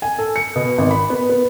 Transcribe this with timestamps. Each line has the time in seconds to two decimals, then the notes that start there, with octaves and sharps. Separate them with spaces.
0.02 G#5
0.19 A4
0.36 C#7
0.56 B2
0.78 G#1
0.91 B5
1.10 B3
1.30 B3